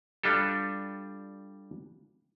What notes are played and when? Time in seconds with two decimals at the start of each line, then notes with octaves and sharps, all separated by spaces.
0.23 G3 D4 F4 G4 A4